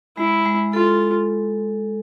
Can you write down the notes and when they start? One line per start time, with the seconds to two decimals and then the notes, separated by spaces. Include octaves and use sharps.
0.17 G#3 E4
0.45 G#3
0.73 F4 A4